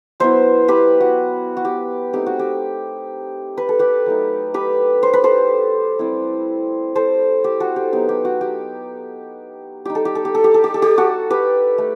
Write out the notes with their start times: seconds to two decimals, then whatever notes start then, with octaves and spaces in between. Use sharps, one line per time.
0.20 F#3 B3 E4 C5 E5
0.68 G4 B4
1.01 F#4
1.57 F#4
1.65 G4
2.13 A3 C4 D#4 G4
2.26 F#4
2.39 G4
3.58 B4
3.69 A4
3.79 G4 B4
4.06 F#3 A3 D#4
4.54 G4 B4
5.03 C5
5.13 B4
5.24 A4 C5
5.99 G3 C4 E4
6.95 A4 C5
7.44 G4
7.60 F#4 A4
7.76 G4
7.92 F#3 B3 D#4 G4
8.09 G4
8.25 F#4
8.41 G4
9.85 G3 D#4 G4
9.95 A4
10.05 G4
10.15 A4
10.25 G4
10.35 A4
10.44 G4
10.54 A4
10.64 G4
10.74 A4
10.82 G4
10.98 F#4 A4
11.30 G4 B4
11.78 A3